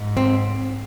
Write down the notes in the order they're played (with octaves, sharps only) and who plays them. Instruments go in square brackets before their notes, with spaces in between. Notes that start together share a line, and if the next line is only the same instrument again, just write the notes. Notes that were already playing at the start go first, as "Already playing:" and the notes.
Already playing: [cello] G#2
[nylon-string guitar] C4